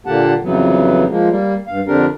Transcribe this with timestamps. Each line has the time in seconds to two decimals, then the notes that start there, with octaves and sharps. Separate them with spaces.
0.06 A#2 D3 A#3 G4 F#5 A5
0.43 F2 C#3 E3 F#3 B3
1.09 F3 G#3 A#3
1.29 G3 A#3
1.68 G2 F5
1.87 F2 D3 C4 D4 G4 A#4